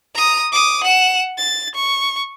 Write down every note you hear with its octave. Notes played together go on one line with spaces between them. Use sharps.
A#5 D#6
D6 D#6
F#5 E7
A6
C#6